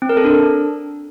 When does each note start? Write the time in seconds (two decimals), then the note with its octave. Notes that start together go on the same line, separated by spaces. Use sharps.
0.02 C4
0.09 A#4
0.17 A4
0.24 D4